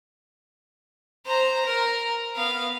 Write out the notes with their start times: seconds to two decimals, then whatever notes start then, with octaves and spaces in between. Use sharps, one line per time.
1.26 C5 A#5
1.66 A#4
2.36 B3 F5